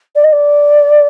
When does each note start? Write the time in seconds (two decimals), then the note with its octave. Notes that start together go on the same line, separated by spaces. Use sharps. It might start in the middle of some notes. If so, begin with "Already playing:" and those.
0.15 D5
0.24 D#5
0.32 D5